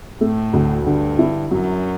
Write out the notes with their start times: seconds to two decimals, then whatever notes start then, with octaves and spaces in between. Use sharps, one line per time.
0.21 A2 A3
0.53 D2
0.86 G2 D3
1.19 E4
1.51 F#2 F#3